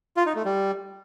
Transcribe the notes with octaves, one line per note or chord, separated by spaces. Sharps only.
F4
D#4
A3
G3